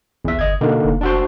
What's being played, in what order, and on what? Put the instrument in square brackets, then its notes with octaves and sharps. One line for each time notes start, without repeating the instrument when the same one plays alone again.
[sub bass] B1 [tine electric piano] E2 E5
[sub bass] G1 [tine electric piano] D#5 G#6
[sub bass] B2 [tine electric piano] D3 A#3 D#4
[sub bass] F1
[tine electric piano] D4 F#4 C5